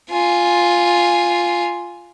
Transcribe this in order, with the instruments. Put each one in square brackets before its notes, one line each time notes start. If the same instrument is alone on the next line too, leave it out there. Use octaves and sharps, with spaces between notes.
[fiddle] F4 G#5